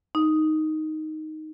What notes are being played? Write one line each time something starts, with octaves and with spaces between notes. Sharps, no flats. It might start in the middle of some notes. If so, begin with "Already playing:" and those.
D#4